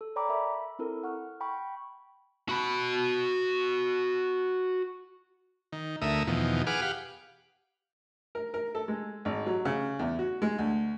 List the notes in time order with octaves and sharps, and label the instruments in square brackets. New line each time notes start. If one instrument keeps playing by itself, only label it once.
[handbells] A4
C#5 D5 G5 A#5 B5 D6
A#4 E5 B5
C4 E4 A4 A#4
F#5 C#6 F6
G5 B5 C#6
[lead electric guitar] F#4 B5
[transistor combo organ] D#3
D2 A3 A#4 E5 D#6
E2 B2 D#3 F3
G#4 B4 F#5 D6 F6
G4 F5 F#5
[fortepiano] A#4
A#4
A4
G#3
G#1
F#3
C#3
E2
F#4
G#3
D2